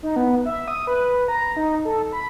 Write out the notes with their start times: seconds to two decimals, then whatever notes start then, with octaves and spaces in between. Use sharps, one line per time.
0.03 D#4
0.16 B3
0.46 E5
0.68 D#6
0.87 B4
1.28 A#5
1.57 D#4
1.85 A4
2.12 B5